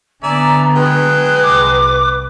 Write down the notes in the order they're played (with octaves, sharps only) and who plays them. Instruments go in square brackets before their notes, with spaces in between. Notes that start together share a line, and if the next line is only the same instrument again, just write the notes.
[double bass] D3 B3 [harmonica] D5 E5 G#5 [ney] A#5
[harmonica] F#3 G#3 G5 [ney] B4
[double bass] C2 [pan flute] D6